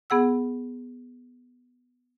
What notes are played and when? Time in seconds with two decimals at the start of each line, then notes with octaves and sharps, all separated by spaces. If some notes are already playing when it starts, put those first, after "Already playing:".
0.10 B3 G#4 F#5 E6